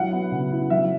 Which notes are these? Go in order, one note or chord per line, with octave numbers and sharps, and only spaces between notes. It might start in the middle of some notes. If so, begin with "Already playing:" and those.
Already playing: F#3 E4 F#5
B3
C#3
E4
F#3 E5